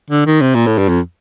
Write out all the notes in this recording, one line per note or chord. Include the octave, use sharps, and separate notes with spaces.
D3
D#3
C3
A#2
A2
G2
F2